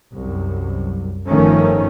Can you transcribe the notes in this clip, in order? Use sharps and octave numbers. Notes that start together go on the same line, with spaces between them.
C2 F#2
G1 G2 D#3 F3 A3 C#4